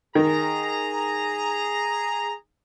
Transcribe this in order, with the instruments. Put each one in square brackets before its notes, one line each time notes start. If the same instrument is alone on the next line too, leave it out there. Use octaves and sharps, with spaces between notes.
[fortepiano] D#3 [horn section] G#4 A#5